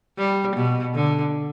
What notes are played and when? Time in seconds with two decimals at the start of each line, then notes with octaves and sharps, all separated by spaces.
0.18 G3
0.56 B2
0.95 D3